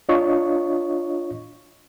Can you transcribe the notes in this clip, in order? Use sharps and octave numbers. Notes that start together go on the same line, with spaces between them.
D4 F4 C#5 D#5 C#6